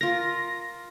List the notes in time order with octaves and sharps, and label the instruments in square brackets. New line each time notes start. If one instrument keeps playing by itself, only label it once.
[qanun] F4 A#4 [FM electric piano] A#6